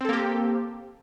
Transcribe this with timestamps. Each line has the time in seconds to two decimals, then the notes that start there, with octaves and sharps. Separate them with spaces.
0.01 C4
0.05 A4
0.09 A#3
0.13 G4